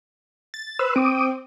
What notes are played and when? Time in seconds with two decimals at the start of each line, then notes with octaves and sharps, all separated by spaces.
0.54 A6
0.79 B4 C5 E6
0.96 C4 D6 D#6